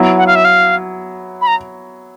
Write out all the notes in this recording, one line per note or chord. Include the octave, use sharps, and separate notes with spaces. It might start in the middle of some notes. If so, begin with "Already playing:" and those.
Already playing: F#3 B3 E4
F#5
F5
E5
F5
B5
A#5